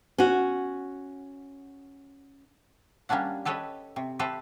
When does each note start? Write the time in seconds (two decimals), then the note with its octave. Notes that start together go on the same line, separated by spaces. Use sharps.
0.18 C#4 F#4
3.09 G3 A#3 C#4 D4 F#5
3.45 G4 A4 B4 C#5 D#5
3.96 C3
4.19 G4 A4 B4 C5 E5